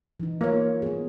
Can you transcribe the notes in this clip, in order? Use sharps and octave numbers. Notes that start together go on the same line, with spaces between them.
E3 D#4
A#3 F4 C#5
B3 G#4